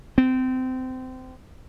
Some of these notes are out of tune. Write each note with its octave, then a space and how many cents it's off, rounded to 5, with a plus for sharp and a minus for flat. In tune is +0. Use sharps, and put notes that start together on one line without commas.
C4 -25